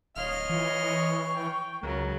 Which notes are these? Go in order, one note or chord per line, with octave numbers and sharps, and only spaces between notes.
D1 C#5 D#5 F5 C6 F6
E3 F4
C#6
G5
C#2 C#3 F#3 A#4